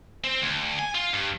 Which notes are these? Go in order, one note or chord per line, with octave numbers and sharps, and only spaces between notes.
C4
D2
G#5
F4
G2